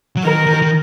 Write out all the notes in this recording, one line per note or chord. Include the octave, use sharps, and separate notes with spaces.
F#3
D#3 A#4
D#3
D#3